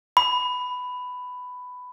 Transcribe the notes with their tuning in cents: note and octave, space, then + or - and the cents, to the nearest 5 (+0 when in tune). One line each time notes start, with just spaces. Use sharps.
B5 +10